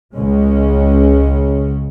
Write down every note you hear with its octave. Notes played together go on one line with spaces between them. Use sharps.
C#2 C#3 G#3 C#4